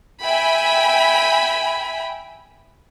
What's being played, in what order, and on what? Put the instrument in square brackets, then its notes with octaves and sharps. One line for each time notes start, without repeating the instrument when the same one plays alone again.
[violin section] E5 G5 G#5 B5